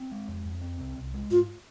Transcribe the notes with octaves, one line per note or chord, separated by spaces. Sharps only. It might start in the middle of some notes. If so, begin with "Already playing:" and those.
Already playing: C4
G#3
F2
F2
C4
C2
C2
G#3
G#2 F4